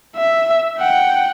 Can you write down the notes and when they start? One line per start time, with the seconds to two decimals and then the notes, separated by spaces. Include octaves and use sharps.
0.16 E5
0.78 F#5 G5